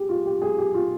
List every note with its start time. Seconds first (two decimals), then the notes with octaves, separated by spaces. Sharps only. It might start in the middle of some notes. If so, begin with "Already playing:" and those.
Already playing: G4 G#4
0.09 F4
0.25 G4
0.42 G#4
0.58 G4
0.74 F4